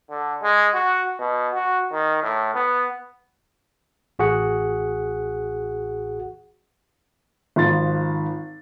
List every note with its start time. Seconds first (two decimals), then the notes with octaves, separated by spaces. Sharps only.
0.10 D3
0.43 G#3
0.74 F#4
1.19 B2
1.54 F#4
1.92 D#3
2.23 A2
2.55 B3
4.19 A1 F#4 G#4 F#5
7.56 G#1 F3 C6 A6